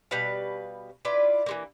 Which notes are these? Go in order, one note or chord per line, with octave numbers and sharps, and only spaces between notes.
B2 G3 B4 F5
E4 F4 B4 D5
E3 G#3 A#3